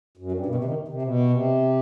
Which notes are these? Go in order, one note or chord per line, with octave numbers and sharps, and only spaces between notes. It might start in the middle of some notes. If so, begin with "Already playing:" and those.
F#2
G2
B2
C3
D#3
C3
B2
C3